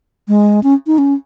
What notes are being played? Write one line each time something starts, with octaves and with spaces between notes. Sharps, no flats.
G#3
C#4
D#4
C#4